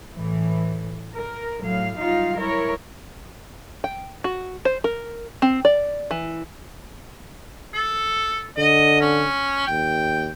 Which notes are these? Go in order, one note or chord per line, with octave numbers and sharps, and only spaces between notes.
A2 E3
A#4
A2 F#3 F5
F#3 G3 D#4 F4 F5
E4 A#4 C#5
G5
F#4
C5
A#4
C4
D5
E3
A4
D3 D#5
C#4
D#2 G5